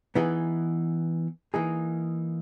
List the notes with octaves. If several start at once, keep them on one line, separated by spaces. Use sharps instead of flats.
E3 B3 D#4 G#4
E3 A#3 D#4 G#4